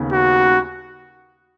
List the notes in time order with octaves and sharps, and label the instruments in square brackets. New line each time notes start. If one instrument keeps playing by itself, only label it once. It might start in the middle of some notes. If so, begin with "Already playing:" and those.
Already playing: [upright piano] D#2 C#3 B3 D#4
[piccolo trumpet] F#4